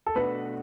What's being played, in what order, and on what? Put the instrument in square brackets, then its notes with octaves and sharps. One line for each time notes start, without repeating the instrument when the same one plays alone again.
[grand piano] A4
[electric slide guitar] B2 A3 D4 F#4 [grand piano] B4